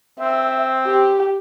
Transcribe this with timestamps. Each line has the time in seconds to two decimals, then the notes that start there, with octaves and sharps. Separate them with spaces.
0.20 C4 E5
0.86 G4